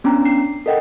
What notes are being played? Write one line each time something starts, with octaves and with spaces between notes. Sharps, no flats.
B3 C#4 D4 G5 A#5
C7
A4 A#4 D#5 F#5 G5